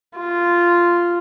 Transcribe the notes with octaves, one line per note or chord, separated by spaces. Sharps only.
F4